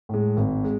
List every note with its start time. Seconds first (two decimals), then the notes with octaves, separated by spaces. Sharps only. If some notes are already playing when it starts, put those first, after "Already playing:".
0.09 A2 G#3
0.37 G#1
0.64 G#3